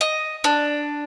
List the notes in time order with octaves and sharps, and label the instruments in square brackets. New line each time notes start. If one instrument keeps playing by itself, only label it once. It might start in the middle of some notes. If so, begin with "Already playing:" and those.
[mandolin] D#5
D4